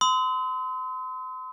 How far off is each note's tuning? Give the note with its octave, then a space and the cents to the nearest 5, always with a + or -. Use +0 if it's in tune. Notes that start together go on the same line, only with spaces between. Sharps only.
C6 -35 D#6 +45